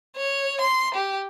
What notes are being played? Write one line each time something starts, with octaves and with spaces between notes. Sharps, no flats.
C#5
C6
G4